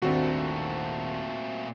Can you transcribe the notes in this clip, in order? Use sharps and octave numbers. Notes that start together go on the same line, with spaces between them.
D#1 G#1 A#2 A3 C4 D4 F#4